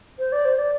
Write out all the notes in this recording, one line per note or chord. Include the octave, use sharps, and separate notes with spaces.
C5
D5
C5
D5